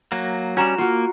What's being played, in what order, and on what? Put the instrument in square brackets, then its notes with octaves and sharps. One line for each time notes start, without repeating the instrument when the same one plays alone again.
[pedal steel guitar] F#3 A#3
[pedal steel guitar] G3 C#4 [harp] F#4 A#5 E7
[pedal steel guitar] A#3 [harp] F4 F#4